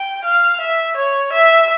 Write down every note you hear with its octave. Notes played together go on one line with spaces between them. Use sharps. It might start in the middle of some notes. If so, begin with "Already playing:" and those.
Already playing: G5
F5
E5
C#5
E5